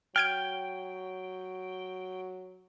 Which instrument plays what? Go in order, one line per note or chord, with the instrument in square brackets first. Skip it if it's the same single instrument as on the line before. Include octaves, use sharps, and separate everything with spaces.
[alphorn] F#3 [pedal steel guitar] G5 [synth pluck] F6 G#6 D7